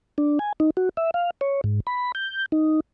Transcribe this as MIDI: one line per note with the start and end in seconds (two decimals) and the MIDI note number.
0.18 0.39 62
0.39 0.53 80
0.60 0.70 63
0.77 0.89 66
0.97 1.11 76
1.14 1.30 77
1.41 1.61 73
1.64 1.80 44
1.87 2.12 83
2.15 2.46 91
2.52 2.80 63